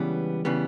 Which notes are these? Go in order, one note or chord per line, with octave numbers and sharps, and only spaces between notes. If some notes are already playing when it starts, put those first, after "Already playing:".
Already playing: C#2 C#3 E3 G3 B3
C#3 E3 G3 B3